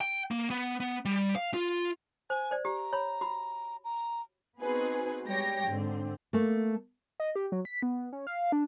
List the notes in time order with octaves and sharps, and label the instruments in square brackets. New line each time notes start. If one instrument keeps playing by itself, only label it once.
[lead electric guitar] G5
A#3
B3
B3
G3
F5
F4
[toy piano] C5 [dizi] G#5
[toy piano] C5 D5
[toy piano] G4 [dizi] A#5
[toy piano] C#5 B5
F#4 B5
[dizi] A#5
[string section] B3 C4 D#4 F#4 G#4 B4
G3 G#3 G4 C#5 G5 A#6
G#2 D3 C4
[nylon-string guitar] A3 A#3
[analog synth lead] D#5
G4
F#3
B6
B3
C#4
F5
D4